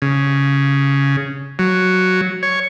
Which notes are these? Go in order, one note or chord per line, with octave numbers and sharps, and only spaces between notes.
C#3
F#3
C#5